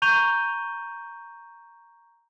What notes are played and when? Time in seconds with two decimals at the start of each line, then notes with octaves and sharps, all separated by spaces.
0.02 A#5 C#6 G6 D#7 F7 G7